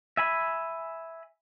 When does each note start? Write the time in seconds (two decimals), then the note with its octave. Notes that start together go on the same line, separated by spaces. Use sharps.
0.17 E5 G#5 B5